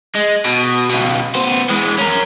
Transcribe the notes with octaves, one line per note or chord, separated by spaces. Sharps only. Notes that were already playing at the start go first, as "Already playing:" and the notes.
G#3
B2
C#2 B2
B3 C5
E3 G#3
C#4 A#4